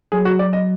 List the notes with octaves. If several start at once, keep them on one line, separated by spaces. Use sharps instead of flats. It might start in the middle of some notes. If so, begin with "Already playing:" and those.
F#3 G#4
F#4
D5
D#5